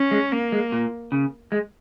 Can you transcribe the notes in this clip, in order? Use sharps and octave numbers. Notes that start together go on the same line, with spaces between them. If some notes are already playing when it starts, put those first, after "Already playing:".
Already playing: C#4
G#3
A#3
G#3
A#2
C#3
G#3